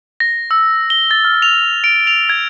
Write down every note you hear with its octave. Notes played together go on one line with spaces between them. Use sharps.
A#6
E6
G7
A6
F6
F7
D7
F7
G#6